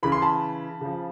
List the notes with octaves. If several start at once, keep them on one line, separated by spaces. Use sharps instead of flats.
C#3 E3 B5
C6
A5 B5
C#3 F3